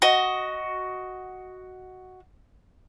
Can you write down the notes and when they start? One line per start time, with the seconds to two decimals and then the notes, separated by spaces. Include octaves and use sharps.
0.02 F#4 D#5